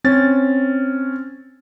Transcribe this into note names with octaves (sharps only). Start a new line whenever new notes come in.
C4 C#4 A6